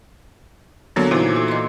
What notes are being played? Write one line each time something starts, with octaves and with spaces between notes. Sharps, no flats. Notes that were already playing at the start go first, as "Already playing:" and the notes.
D3 F#3 A#3 B3
A#2 E3 D#4 F#4 C5
A4
D#5 C6